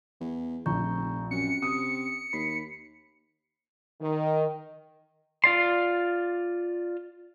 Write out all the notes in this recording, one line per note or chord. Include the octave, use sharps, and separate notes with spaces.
E2
F1 A#1 A#5 C#6 G6
F#2 C4 C#4 C#7
C3 D#6
D#2 B5 B6 C7
D#3
F4 D5 C6